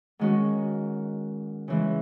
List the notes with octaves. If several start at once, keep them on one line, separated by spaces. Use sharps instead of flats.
G#2 D#3 G#3 C#4 F#4
C#3 E3 G#3